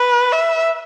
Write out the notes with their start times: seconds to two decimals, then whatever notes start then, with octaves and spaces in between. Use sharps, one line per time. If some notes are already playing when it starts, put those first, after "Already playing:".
Already playing: B4
0.32 E5